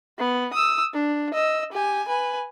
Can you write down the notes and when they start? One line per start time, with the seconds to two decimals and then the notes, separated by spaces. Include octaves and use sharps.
0.19 B3
0.54 D#6 E6
0.94 D4
1.34 D#5 E6
1.73 G4 G#5
2.08 B4 G#5